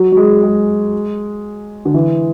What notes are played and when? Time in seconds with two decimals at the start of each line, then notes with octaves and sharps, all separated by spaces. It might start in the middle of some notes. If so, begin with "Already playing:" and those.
Already playing: F#3
0.12 F#3
0.17 G#3
0.43 G#3
1.85 D3
1.94 E3